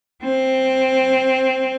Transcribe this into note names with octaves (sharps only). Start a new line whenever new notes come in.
C4